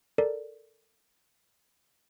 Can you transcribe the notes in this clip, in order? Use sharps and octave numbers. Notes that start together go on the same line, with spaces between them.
A4 A#4 D5